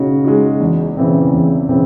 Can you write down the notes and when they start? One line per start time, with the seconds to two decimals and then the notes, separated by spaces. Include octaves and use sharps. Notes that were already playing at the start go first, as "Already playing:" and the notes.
Already playing: C#3 D#4 F#4
0.25 G#3 D#4 F#4
0.60 E2
0.97 C#3 E3 C4
1.33 E2
1.69 C#3 E3 C4